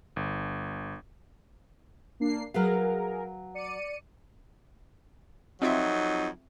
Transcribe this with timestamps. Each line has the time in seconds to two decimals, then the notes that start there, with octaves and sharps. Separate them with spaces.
0.16 G1
2.20 A#3 D4 C7
2.54 F#3 G#4 A#4 B4 F5
3.54 D5 C#7 D#7
5.62 F2 F#3 C4 D#4 F4 E5